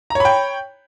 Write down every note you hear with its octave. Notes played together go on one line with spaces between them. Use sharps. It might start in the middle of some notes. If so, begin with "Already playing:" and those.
C#5 G5 A#5 B5